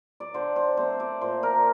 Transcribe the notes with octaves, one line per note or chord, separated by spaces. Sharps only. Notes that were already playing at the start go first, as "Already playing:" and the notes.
D5
D3 C5
C5
A3 C4 C5
D5
A#2 C5
A#4